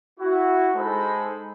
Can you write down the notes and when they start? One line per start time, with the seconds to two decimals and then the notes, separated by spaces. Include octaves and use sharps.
0.20 E4 F#4
0.76 G#3 D#4 G#4 A4 C5 B5